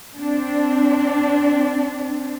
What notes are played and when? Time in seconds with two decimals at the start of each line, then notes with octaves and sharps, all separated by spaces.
0.18 C4 D4